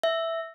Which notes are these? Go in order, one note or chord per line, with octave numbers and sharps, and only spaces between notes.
E5